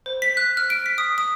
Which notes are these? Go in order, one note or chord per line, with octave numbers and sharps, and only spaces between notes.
C5
B6
F#6
F6
D7
B6
D#6
D#6